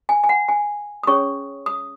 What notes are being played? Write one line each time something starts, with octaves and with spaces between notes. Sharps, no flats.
G#5
G#5
F#5
G#5
D#6
C#4 G#4 C#5 C#6
D#6